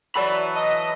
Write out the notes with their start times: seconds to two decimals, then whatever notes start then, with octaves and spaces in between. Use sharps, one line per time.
0.15 E3 F#3 A4 B4 D5 B5
0.55 D#5 A5